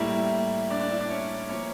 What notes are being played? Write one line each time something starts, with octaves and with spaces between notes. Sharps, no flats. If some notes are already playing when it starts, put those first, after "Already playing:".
Already playing: A2 G3 A#3 E4 E5
D4 D5
D4 D5
E4 E5
D4 D5
C#4 C#5
F3 A#3 C#4 C#5